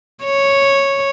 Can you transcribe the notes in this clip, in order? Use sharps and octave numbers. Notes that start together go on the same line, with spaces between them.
C#5